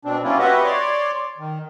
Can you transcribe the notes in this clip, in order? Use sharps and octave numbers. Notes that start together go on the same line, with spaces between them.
B2 C4 D4
F#3 A#3 C4 C#4 E4 F4
F#4 G4 B4 D#5 E5 F#5
C#5 D5 C6 D6
D#3